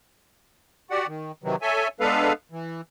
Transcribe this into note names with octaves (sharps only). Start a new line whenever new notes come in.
F#4 G4 D5 F#5
D#3
C3 D#3 E3 F#3
A4 C#5 E5 G#5
G#3 B3 D4 A4 B4 F5
E3